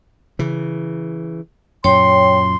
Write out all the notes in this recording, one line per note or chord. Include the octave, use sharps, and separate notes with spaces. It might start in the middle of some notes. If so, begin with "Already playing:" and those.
C#3 E3
F#2 A#2 C#5 G5 C6